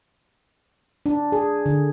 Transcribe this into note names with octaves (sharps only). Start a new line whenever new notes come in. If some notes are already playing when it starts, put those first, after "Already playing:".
D4
G#4
D3